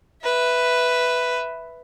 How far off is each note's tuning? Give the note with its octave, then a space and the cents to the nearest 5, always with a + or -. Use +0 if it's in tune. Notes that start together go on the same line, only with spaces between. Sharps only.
B4 +0 E5 +0